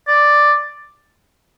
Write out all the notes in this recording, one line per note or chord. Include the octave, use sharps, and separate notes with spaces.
D5